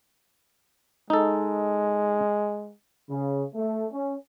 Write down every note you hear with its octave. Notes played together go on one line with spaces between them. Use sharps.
G#3 D#4 A4
C#3
A3
C#4